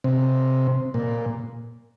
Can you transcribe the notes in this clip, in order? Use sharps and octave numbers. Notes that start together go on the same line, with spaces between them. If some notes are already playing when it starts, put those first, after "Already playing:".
C3
A#2